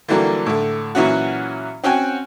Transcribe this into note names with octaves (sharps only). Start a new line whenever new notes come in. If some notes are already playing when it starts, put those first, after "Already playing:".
D3 E3 F#3 G3 A#3
A2 D3
A#2 E3 F#3 C#4 E4 F#4
C4 C#4 F#4 G5 G#5